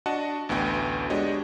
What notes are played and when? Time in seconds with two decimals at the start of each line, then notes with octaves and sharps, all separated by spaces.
0.06 D4 F#4 D#5 F#5 A5
0.49 A1 D2 B3 F#4 G5
1.10 G#3 D4 F#4 G4 C#5 D#5